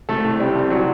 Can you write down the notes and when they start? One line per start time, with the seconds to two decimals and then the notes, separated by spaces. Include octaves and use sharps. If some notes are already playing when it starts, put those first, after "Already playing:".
0.09 C2 A3 A4
0.25 C2
0.40 C3 G3 G4
0.55 C2
0.70 C3 F#3 F#4